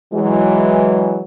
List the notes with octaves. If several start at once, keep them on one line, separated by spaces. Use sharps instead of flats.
E3 F#3 G#3